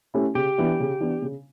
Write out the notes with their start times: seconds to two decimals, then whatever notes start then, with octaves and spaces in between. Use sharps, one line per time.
0.14 A3 C#4 E4 G4
0.35 C#3 G4
0.58 E3 B3 D4
0.80 C#3
1.00 E3 B3 D4
1.22 C#3